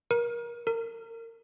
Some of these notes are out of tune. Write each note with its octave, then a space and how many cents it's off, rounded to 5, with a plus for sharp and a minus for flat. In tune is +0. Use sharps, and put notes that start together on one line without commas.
A#4 +25
A#4 -30